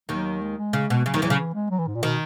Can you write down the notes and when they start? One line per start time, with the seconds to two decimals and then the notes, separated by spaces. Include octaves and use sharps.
0.09 D#2 D#3 F#3
0.41 G#3
0.58 G#3
0.73 C#3
0.90 B2
1.06 C#3 F#3
1.14 D#2 D#3
1.22 E2 E3 F#3
1.30 C#3
1.39 E3
1.54 G#3
1.70 F#3
1.79 E3
1.87 G#2
1.95 A#2
2.03 B2 D#3